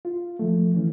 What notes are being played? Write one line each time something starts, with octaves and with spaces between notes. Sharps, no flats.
F4
F3 A3
E3 C#4